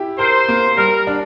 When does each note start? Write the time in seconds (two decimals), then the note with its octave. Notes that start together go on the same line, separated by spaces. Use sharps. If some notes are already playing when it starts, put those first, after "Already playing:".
Already playing: E4 G4
0.19 A#4 C5
0.48 A#3
0.77 G3 A#4
1.07 D4